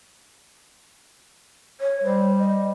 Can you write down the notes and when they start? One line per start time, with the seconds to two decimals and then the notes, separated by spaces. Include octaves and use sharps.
1.81 C#5
2.04 G3 C5
2.39 D#5